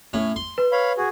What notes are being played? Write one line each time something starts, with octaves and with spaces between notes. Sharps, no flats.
A2 C#4
C6
B4
C#5 F5 B5
F#4 G#4